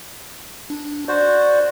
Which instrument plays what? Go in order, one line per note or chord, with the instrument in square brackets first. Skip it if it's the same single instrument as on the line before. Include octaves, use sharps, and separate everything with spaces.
[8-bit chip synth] D4
[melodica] F#4 C5 [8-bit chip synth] D5